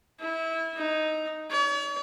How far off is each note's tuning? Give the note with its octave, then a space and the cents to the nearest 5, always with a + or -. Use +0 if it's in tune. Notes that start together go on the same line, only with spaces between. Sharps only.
E4 -20
D#4 +0
C#5 +45